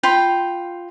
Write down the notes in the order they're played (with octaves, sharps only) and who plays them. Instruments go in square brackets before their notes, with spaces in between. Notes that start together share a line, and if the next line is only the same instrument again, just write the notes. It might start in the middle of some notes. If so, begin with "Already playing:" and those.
[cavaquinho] F4 G5 B5